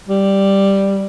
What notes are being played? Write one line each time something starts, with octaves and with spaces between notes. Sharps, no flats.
G3